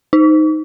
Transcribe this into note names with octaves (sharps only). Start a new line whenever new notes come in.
D#4